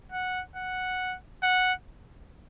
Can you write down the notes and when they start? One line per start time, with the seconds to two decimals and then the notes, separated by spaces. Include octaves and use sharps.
0.12 F#5
0.56 F#5
1.42 F#5